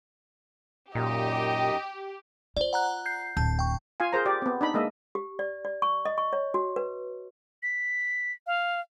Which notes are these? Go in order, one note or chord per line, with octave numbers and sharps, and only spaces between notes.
F#2 A#2 D#4 G4 D#5
F4 C5 D5
F#5 A#5 F#6
G6 C7
D1 A5 G6
G5 C#6
F4 F5 G#5
G#4 A#4 C5 A#5
G4 D5
B3 C4
D4 D#4 B5
G#3 A#3 D#5 E5
G4
D5
D5
C#6
D#5
C#6
C#5
F#4
B4
B6
F5